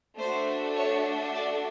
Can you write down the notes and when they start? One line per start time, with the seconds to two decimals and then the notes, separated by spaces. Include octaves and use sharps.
0.18 A3 D4 F#4 A4 C5
0.76 C#5
1.34 D5